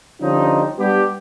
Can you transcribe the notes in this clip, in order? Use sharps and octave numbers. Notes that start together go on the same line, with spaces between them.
D3 F3 G3 C#4 D#4
G3 B3 D4 G4